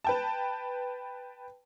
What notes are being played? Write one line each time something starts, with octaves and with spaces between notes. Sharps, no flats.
B4 G5 A5